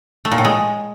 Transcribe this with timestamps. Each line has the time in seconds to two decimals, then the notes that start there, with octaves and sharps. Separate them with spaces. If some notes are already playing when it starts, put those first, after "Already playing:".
0.25 A3
0.31 A#2
0.38 A2
0.45 G#3